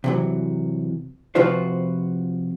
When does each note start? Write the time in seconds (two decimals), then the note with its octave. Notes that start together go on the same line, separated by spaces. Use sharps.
0.04 C3 E3 F#3
1.35 C3 F3 F4 F#4 B4 C5